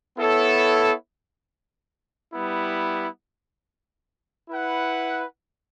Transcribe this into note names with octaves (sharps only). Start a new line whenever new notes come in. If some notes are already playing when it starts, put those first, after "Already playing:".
B3 E4 A4 C#5
G3 B3 E4
E4 B4 F#5